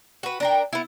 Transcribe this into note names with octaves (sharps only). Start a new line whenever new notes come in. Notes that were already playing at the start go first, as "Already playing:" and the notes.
F#4 B4
D4 A#4 G5
B3 E4